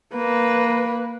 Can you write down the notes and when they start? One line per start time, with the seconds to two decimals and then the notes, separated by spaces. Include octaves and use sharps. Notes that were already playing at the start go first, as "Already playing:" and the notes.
0.15 A#3 B4